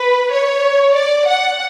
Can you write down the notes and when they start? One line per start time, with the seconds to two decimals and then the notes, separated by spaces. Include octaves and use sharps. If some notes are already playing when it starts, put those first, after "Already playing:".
Already playing: B4
0.31 C#5
0.95 D5
1.27 F#5